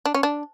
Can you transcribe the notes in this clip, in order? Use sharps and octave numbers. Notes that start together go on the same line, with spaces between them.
D4
C#4
D4